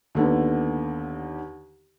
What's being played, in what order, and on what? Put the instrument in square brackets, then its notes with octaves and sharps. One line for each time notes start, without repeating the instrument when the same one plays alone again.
[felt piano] D#2 D3 B3